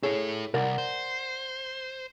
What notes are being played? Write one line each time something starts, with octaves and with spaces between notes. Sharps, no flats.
E4 G#4 A4 C#5
C2 A#4 D5 F#5
C5